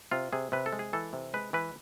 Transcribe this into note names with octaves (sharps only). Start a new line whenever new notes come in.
C3 F4
C3 G#4
C3 B4
A4
G#3
G#4
E3 A4
C3
G#3 B4
E3 B4